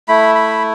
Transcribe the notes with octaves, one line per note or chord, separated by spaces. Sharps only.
A3 E4 B5
B5